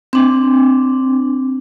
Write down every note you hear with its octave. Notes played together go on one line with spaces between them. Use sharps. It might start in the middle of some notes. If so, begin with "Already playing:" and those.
C4 D4